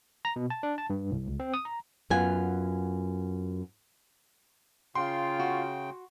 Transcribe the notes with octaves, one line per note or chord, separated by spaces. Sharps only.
A#5
B2
A5
D4
A5
G2
C2
C#2
C4
D#6
A#5
F#2 B3 F4 G#5
C#3 F4 G5 C6
F#4